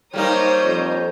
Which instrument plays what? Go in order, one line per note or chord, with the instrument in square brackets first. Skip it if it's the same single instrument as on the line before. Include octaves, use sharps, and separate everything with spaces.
[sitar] G3 A#3 D#4 [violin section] A#4 C#5 G6 [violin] C5 D#6
[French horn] F2